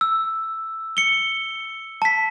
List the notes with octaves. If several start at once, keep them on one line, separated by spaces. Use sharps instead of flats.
E6
C#7 G7
A5 B6